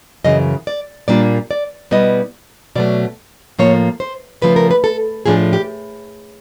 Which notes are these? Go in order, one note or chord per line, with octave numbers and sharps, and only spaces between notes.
F#2 C#3 E3 D#5
D5
A#2 G3 A#3 D4 F4 D5
D5
B2 G3 B3 E4 D#5
B2 F#3 A3 D5
A2 F3 A#3 C#5
C5
C#3 F3 A3 B4
A#4
B4
A4
A2 F3 A3 D4 G#4
G4